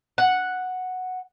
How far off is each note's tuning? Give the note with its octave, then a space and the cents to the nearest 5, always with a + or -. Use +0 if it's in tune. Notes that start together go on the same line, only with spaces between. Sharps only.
F#5 -5